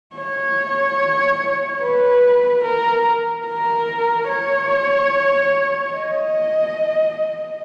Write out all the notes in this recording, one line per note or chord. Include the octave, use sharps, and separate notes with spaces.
C#5
B4
A#4
A#4
C#5
D#5